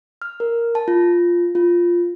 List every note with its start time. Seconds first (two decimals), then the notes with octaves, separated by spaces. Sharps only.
0.22 F6
0.40 A#4
0.75 A5
0.88 F4
1.55 F4